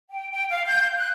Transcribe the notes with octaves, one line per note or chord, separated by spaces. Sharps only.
G5
G5
F5
G6
F#6